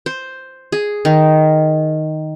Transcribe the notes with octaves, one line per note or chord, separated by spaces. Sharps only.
C5
G#4
D#3